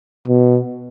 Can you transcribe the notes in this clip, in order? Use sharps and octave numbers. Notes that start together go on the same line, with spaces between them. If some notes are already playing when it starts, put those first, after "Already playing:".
B2